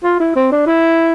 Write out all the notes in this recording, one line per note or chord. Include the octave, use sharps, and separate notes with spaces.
F4
E4
C4
D4
E4